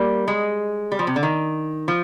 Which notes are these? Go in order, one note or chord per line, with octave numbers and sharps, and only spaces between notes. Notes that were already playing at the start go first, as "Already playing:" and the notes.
Already playing: G3 A#3
G#3
G3
F3
C3
D3
D#3
F3